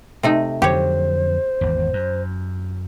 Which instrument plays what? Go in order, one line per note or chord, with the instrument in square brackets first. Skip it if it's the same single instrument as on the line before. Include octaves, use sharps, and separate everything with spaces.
[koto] C3 A3 D#4
[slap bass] F2 D3 F#3 [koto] G4 C#5 [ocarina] C5
[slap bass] G#1 E2
F#2